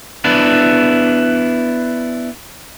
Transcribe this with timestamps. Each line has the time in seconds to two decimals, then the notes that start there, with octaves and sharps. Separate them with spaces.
0.24 B3 D4 E4